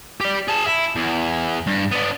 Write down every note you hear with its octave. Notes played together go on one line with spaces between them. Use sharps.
G4 D5
G#4 A5
E4
E2
G2
B3 D4